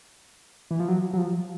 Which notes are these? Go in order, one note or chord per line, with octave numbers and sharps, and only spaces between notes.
E3
F3
F#3
F#3
F3